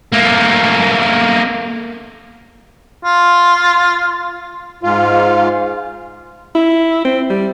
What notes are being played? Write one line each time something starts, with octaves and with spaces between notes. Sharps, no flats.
A3 A#3
F4
G#2 F4
E4
C4
G3